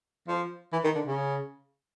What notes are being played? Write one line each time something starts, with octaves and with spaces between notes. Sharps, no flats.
F3
E3
D#3
D3
C#3